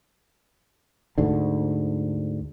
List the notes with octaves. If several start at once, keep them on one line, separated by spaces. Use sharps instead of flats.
D2 G#2 D3